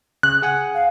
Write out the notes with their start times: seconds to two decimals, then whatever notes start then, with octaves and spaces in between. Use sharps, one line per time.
0.23 C#3 F#6
0.42 G#4 F#5 G#5
0.74 F5